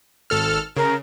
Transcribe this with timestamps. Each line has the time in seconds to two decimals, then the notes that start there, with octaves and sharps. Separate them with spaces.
0.30 G#1 A4 F6
0.76 C#3 A#4